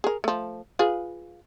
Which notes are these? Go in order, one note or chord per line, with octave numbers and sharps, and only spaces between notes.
G#4 A#4
F3 A3
F4 G#4 B4